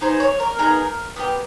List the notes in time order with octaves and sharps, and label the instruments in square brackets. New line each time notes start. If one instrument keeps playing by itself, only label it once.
[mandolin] B3 D#4 G#4 C5
C#5
A#4
B3 D#4 G#4 A#4
B3 D4 G4